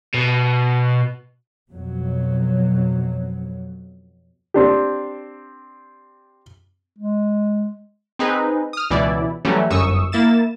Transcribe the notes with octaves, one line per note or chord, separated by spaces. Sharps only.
B2
F2 B2 F#3
C4 D4 G4
G#3
C4 D#4 G#4 B4
D#6 F6
C#2 B2 E3 E4 D5
E3 F#3 G3 A3 C#4
G1 F#2 C#6 D#6 E6
A#3 E4 A6 E7